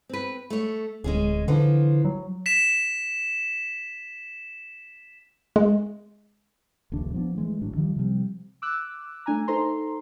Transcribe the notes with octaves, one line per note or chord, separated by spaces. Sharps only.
C4 B4
A3 C#5
D1 G#3 C#4 G#4
D3 E3 F3 D4
F#3
B6 E7
G#3
D#1 A#1 C#3 D4
F3 B3 D4
E3 G#3 A3
G#1 A2 F#3 D4
D#3 F3 G3
C3 F3 G3 C4
D6 E6 F#6
A3 D4 G#5 A#5
D#4 A4 C5 A#5 C6